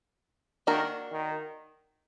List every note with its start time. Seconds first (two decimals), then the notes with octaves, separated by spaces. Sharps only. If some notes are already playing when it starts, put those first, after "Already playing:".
0.67 D#3 A#3 D4 F#4 A#4
1.12 D#3